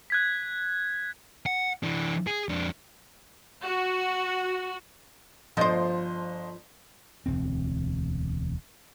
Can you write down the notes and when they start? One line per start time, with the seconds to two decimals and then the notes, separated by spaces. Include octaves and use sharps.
0.10 F#6 G#6 B6
1.46 F#5
1.83 E3 D4
2.27 G#4
2.49 F2 D4
3.64 F#4
5.57 G1 F3 C5 D#5
7.26 E1 D2 C4